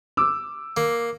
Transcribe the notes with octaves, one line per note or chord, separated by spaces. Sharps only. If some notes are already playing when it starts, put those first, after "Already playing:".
D6 E6
A#3